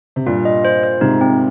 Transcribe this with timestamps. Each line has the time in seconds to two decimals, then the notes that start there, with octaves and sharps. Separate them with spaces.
0.16 C3
0.26 G2 A#2 F4
0.45 D#5
0.65 C5
0.83 C5
1.01 G#2 C3 D#4
1.21 C4